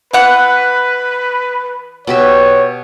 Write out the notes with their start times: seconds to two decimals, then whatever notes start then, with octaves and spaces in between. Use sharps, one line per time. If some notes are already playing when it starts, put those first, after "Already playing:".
0.13 E3 B4 F#5
2.07 B2 G4 C#5 E5